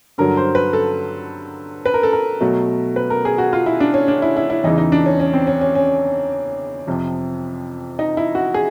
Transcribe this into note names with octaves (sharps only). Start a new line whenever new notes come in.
G2 D3 F#3 A#4
C5
B4
A4
B4
A#4
A4
A#4
B2 F#3 A3
B4
A#4
G#4
F#4
F4
E4
D4
C#4
D4
E4
E4
E4
E2 C#3 E3 D#4
D#4
D4
C#4
C#4
C4
C#4
C#4
C#4
F2 C3 F3
D#4
E4
F#4
G#4